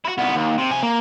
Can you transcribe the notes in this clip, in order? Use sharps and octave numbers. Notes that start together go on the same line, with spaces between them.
E4 F#4
C2 B3
D#2
C3
C3 G#5
A#3